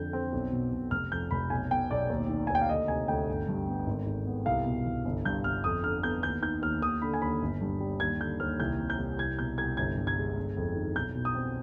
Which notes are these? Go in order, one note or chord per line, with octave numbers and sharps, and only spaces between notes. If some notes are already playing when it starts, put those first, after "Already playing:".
Already playing: F2 D3 G6
C4
B1
B2
B1
F1 F6
F2 G6
F1 B5
B1 G#5
B2 G5
B1 D5
D#2
D#3
G#5
D#2
G5
F5
D2 D#5
C3 G#5
D2 G5
G1
G2
B3
G#1
G#2
B3
C2 F5
B2
C2
G1
G2 G6
G1 F6
F2 D#6
D3 F6
B3 G6
D#2 G6
D#3 G6
D#2 F6
D#2 D#6
D3 B5
G#5
D#2 B5
G1
G2
G3
D#2 G#6
D3 G6
D#2 F6
C2 G6
C3
G6
C2
C2 G#6
B2 G6
C2 G#6
G1 G#6
G2
G#6
G#3
G1
F2
D#3
B1 G6
B2
D#6
C4